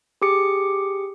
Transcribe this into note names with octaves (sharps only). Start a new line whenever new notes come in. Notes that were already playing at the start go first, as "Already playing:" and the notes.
G4 G#4 D6 C#7